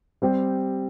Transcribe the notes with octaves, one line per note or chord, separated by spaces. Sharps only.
G3 C4 G4